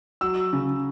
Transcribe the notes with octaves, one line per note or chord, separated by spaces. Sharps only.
F#3 E6
C#3